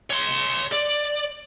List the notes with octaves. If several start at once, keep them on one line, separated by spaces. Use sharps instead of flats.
C#5 C6
D5